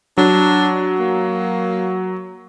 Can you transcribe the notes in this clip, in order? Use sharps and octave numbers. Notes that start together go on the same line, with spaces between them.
F#3 D4
A#3